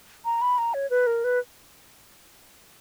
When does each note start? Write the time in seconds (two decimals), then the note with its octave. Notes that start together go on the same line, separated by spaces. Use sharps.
0.25 A#5
0.42 B5
0.58 A#5
0.74 C#5
0.90 B4
1.07 A#4
1.24 B4